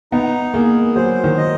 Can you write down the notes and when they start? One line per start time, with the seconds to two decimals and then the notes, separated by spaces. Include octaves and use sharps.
0.12 B3 D#4
0.54 A#3 G#4
0.96 F#3 C5
1.24 D#3
1.38 D#5